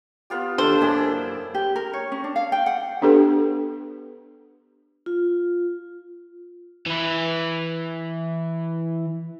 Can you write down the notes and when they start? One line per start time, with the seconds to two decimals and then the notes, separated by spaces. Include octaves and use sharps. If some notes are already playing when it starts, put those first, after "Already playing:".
0.30 B3 F4 G4
0.58 D#2 D4 F4 G4 A4 C5
0.81 F#2 G#3 A#3 E4 G4
1.55 G4
1.76 A#4
1.93 C#5
2.12 C#4
2.24 D4
2.36 F5
2.52 G5
2.66 F#5
3.01 B3 D4 G4 A4 B4
5.06 F4
6.86 E3 B4